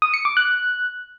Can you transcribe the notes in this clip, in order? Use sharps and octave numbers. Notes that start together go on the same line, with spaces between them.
D#6
C#7
D6
F#6